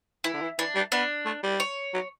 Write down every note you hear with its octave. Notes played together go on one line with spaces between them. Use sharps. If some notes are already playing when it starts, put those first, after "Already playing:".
E3 E4
D3
E3
E3 D4
G3
B3 D4
A3
G3
C#5
F#3